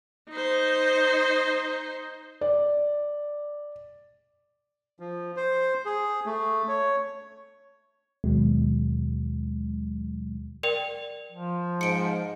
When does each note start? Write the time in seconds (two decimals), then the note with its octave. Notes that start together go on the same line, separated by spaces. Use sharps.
0.30 D#4 C5
2.41 D5
5.00 F3
5.36 C5
5.85 G#4
6.26 A3
6.68 C#5
8.24 D#2 B2 F#3 G#3
10.63 A#4 D5 G5
11.31 F3
11.81 G#2 C#7 D7